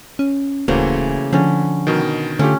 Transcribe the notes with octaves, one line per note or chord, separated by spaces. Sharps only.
C#4
D1 C#3 E3 F#3 A3 A#3 C5
D3 F3 C#4
B2 D#3
D3 A3 C#4 F4 G4